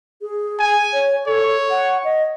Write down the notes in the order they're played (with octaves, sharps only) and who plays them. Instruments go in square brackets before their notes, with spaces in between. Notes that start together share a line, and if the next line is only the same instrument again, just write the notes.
[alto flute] G#4
[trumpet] G#5
[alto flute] C#5
[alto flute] A4 [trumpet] C#5
[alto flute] F#5
D#5